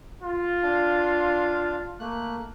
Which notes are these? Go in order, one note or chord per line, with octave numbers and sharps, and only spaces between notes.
F4
D4 F5
A3 A#3 F#6